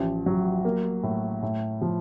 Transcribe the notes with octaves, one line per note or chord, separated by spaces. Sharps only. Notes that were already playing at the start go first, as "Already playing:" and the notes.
Already playing: A1 F3
F#3
A#3
A2
A2
F3